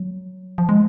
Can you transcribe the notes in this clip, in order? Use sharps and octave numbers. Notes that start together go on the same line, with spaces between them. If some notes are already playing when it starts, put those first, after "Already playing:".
Already playing: F#3
F3
G#3